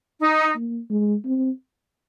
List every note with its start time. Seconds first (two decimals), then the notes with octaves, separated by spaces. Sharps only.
0.20 D#4
0.55 A#3
0.90 G#3
1.25 C4